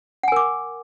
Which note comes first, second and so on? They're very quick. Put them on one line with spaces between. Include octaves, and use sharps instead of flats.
F#5 G#5 A#4 D6